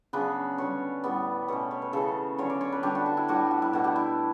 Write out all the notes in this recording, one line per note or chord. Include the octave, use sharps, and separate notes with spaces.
C#3 F#3 B3 D4 B4
D3 G3 C#4 C#5
A2 G3 B3 D5
B2 A3 C#4 C#5
C#5
B4
C#3 E3 A3 A4
D3 F#3 C#4 C#5
D5
C#5
B4
D3 G3 D4 G4
F#4
F#4
E4
A2 G3 D4 F#4
F#4
E4
B2 A3 D4 F#4
G4
E4